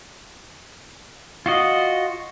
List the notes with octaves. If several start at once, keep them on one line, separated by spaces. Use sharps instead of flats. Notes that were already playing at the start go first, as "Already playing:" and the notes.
F4 F#4 D#5